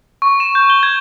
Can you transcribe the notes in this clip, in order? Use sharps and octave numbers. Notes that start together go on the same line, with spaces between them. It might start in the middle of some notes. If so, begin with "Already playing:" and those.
C#6
E7
G6
G7
G#6